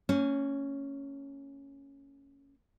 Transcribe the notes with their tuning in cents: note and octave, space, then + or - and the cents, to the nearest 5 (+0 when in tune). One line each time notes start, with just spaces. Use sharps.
A#3 -40 C#4 +0